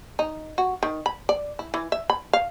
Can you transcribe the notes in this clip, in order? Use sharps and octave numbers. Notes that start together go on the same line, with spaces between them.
D#4
F#4
D#3
B5
D5
E4
E3
E5
B5
F5